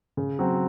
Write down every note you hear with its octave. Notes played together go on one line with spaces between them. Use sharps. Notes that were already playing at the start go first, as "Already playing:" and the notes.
C#3
F#3 C4